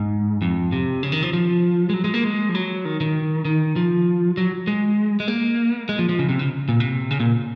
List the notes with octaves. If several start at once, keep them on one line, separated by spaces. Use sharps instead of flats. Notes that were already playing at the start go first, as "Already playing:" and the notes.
Already playing: G#2
F2
C3
C#3
D#3
F3
F3
G#3
F#3
G#3
A#3
G#3
F3
F#3
D#3
D#3
D#3
F3
F#3
G#3
G#3
A#3
G#3
F3
F3
C#3
C3
C#3
A#2
C3
C#3
A#2